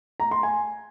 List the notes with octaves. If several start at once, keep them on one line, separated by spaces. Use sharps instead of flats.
A#5
C6
G#5